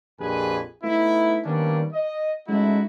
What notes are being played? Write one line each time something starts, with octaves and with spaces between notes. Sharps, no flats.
A#1 F2 G4 G#4 B4 G#5
A3 B3 D#4 E4
D#3 G3 A#3 B3 C#4 D4
D#5
G#3 A3 C#4 D#4 E4 F#4